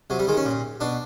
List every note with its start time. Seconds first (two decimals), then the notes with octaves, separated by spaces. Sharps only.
0.10 C3 F#3
0.19 G3
0.27 D#3 G#3
0.37 C#4
0.45 A#2
0.80 B2 D4